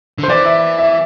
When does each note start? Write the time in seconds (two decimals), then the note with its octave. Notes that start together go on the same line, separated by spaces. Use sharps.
0.19 D3 C5
0.29 E3 D5
0.46 E5
0.78 E5